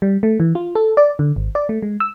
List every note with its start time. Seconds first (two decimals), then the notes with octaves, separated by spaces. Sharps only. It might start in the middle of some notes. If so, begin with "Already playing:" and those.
0.02 G3
0.23 A3
0.40 E3
0.55 F4
0.75 A4
0.97 D5
1.19 D3
1.36 G#1
1.55 D5
1.69 A3
1.82 G#3
2.00 E6